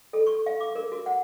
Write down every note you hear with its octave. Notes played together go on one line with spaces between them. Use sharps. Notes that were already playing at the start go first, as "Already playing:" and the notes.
A4
C#6
F5
D6
A#4
F#4
F#5